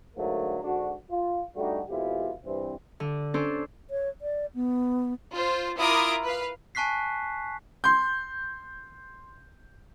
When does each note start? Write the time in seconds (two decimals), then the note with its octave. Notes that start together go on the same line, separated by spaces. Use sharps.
0.17 G#2 D3 F#3 A3 A#3
0.63 G#2 D3 D4 F#4
1.11 F4
1.56 G3 A3 D4 D#4 F#4
1.89 F2 B2 G#3 E4 F4 G4
2.45 G2 E3 C4
3.00 D3
3.34 C#4 D4 A4 C5
3.90 C#5
4.21 D5
4.55 B3
5.32 F4 C5
5.77 E4 F4 A#4 D6 D#6 D7
6.24 B4 F5
6.75 G#5 A5 C#6 F#6 B6 C7
7.84 C6 G6